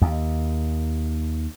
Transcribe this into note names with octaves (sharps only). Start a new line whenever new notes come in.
D#2